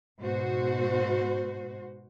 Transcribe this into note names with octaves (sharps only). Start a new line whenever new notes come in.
G#2 B2 F#4 C5